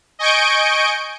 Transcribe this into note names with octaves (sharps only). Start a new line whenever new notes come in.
D#5 G#5 C#6 G6 D7